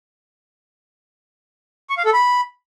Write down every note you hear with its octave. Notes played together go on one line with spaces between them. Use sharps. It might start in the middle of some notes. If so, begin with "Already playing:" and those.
C#6
F5
A4
B5